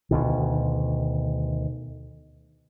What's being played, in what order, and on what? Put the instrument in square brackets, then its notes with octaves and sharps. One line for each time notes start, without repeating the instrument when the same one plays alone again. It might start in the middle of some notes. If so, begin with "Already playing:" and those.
[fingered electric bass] D2 B2 D#3